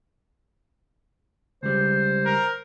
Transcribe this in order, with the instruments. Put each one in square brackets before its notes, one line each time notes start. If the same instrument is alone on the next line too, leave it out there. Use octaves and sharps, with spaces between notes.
[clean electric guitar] C#2 G3 [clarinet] C5
[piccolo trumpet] A#4